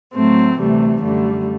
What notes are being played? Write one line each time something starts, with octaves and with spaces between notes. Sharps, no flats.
A2 F#3 A3 C4
D2 C3 E3 G3 A3
F#2 D3 G3 A3